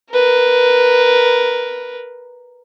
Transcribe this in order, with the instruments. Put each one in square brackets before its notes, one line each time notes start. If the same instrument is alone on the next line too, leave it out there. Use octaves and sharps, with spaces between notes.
[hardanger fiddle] A#4 B4